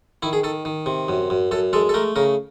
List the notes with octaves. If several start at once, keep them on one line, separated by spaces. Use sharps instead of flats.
D#3 E4
G#4
D#3 A4
D#3
C3
F#2
F#2
F#2 A4
G#3 A4
A4
A3 A#4
C#3 A#4